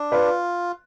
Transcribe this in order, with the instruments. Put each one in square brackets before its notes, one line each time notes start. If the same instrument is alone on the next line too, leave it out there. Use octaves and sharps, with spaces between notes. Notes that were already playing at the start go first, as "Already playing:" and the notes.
Already playing: [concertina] D4
[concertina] F4 [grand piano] B4 D5